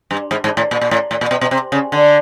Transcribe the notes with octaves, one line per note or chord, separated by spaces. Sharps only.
G2
G#2
G#2
A2
A#2
A#2
A2
A2
A#2
B2
B2
C3
C#3
D3